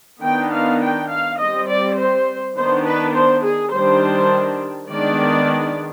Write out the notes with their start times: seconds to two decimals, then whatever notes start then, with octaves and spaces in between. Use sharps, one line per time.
0.23 D#3 B3 D4 G5
0.52 F5
0.82 G5
1.11 F5
1.40 G3 C4 D#5
1.69 D5
1.98 C5
2.57 D#3 B3 D4 C5
2.86 B4
3.15 C5
3.44 G#4
3.73 D#3 G3 D4 C5
4.90 D#3 G#3 B3 D4 D5